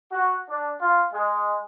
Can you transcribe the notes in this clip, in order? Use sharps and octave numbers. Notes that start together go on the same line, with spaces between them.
F#4
D4
F4
G#3